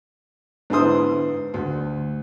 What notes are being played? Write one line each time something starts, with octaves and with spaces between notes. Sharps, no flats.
G#2 D3 B3 E4 C5 D#6
D2